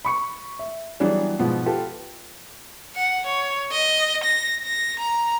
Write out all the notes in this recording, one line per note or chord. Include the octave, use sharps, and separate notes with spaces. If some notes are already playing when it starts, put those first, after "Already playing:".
B5 C#6 C#7
E5
E3 F#3 G3 B3 D4 G#4
G#2 B2 F3 B3
F4 G4 A4 B4 A5
F#5
C#5
D#5
A#6
A#6
A#5